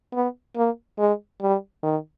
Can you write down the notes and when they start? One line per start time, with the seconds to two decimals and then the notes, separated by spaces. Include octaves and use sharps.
0.13 B3
0.56 A#3
0.99 G#3
1.42 G3
1.83 D#3